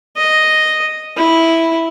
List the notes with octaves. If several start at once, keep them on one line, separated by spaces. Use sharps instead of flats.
D#5
E4